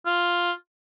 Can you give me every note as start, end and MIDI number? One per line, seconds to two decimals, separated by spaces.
0.06 0.52 65